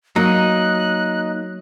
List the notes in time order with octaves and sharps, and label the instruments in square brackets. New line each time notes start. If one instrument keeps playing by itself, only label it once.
[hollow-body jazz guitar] F#3 [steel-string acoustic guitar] A#3 [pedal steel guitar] D#4 D#5 [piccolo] F#6